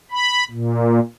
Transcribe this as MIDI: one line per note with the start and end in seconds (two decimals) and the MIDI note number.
0.11 0.44 83
0.51 0.99 46